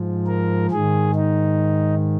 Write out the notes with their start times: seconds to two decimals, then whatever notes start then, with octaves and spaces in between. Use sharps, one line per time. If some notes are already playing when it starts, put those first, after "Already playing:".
Already playing: G#2 F3
0.27 A#4
0.71 G#2 D#3 G#4
1.15 D#4